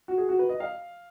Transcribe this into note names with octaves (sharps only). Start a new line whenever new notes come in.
F#4
G#4
F#4
B4
D#5
F5